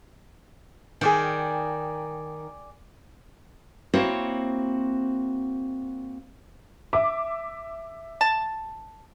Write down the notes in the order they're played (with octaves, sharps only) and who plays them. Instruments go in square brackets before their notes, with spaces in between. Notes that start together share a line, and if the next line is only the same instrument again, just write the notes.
[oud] D#3 [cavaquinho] G#4 D5 G5
[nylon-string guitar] A#3 C4 E4 F#4 C5 C#5
[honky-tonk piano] E5 D6
[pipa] A5